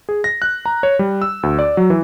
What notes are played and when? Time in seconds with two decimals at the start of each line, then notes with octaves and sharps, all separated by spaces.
0.09 G#4
0.24 A#6
0.42 F#6
0.66 A#5
0.83 C#5
0.99 G3
1.22 E6
1.43 D2
1.59 D5
1.77 F#3
1.90 E3